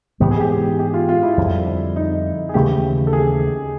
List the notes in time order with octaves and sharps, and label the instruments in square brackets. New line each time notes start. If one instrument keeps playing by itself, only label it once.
[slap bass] G#2 E3 G#3 B3 [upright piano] G4
[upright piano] G#4
G4
G4
F4
F4
E4
[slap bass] F2 D3 G3
[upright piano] D#4
G#4
[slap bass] D#2 C#3 E3 A3 [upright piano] G4
[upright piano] A4
G#4